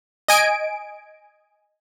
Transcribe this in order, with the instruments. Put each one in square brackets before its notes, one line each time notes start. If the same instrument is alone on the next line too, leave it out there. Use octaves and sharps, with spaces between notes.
[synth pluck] D#5 G#5 D7